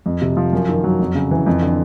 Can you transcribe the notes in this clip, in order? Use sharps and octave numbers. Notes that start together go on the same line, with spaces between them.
F2
C3
F3
F#2
D#3
F#3
F2
C#3
E3
F2
D3